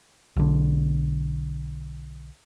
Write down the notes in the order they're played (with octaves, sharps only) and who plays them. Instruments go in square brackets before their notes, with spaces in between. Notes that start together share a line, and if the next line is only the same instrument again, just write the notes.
[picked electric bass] B1 D3